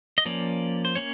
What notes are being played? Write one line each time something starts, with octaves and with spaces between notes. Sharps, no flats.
D#5
F3 A#3 C#4 D5
C5
A#3 C#4 C#5